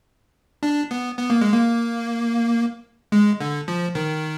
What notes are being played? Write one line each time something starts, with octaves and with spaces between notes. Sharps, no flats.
D4
B3
B3
A#3
G#3
A#3
G#3
D3
F3
D#3